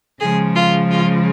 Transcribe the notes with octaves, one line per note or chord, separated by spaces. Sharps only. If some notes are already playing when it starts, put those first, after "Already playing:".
C#3 F3 G#3 G#4
F4
F4